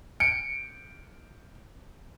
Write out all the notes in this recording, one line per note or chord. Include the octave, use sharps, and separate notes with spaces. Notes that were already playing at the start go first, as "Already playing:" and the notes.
C#7 D7